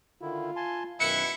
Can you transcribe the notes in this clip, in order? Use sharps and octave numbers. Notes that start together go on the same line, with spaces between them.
D3 D#3 E4 F4
G#5 A5 C6
F#2 B2 D#3 E4 E5 F#6 C#7